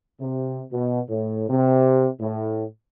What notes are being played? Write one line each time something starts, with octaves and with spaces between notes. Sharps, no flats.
C3
B2
A2
C3
A2